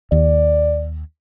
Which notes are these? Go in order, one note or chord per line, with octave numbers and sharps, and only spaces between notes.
D#2 D5